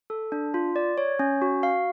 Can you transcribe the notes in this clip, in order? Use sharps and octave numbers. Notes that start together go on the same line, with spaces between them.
A4
D4
F4
D5
C#5
C#4
F#4
F5